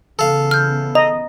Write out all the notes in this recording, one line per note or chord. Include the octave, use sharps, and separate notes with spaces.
C#3 E3 B3 A4 F5
F6 G6
D#5 A#5